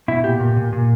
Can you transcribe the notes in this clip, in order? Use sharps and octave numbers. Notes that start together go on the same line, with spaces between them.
B2 E4
A#2 G4
A#2
A#2
A#2